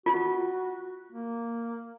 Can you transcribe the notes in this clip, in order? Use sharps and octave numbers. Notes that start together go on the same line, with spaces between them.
F4 F#4
A#3